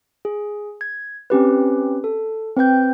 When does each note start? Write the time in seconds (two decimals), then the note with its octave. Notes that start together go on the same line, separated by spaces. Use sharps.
0.25 G#4
0.81 G#6
1.30 C4 C#4 G4 B4
2.04 A4
2.57 C4 B4 G5 G6